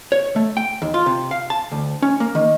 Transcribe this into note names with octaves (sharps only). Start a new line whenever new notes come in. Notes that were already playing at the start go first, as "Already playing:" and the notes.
C#5
A3
G5
D#2
F4
C3
F5
A5
D2
C#4
A#3
D#3